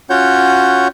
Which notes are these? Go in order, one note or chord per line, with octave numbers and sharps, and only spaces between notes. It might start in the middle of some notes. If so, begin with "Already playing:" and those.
C#4 F4 F#4 C#5 F#5 G6